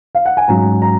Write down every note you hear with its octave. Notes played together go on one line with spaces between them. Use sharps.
F5
F#5
G#5
G#2 F#3 C#4 A#5
A#5